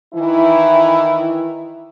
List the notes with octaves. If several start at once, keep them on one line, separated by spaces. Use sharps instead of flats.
D#3 E3 E4